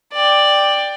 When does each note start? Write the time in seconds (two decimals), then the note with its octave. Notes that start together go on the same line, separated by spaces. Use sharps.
0.13 D5 G5